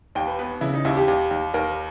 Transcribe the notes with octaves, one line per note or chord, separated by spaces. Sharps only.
D#2 G5
B4
B3 B4
C#3 E4
D#4
D#2 E4
G4
D#2
D#2
D#2 A#4